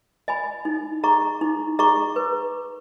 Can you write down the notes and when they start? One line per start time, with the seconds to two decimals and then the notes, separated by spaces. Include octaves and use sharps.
0.28 D#5 G#5 B5
0.65 D#4
1.03 G#4 D#5 A#5 C#6
1.41 D#4
1.79 G#4 D#5 A#5 C#6
2.16 B4